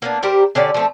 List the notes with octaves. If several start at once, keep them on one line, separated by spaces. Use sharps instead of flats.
A#3 B3 D4
G3 G4 A#4 C5
D3 C#4 G4 D5
F3 A3 C4